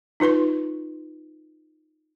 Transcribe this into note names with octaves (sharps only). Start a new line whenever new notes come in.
D#4 F4 B4 C6 C#6